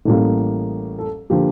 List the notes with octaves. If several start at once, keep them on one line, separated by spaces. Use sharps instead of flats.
A1 A2 G3 A#3 A4
A4
D3 F3 A#3 G4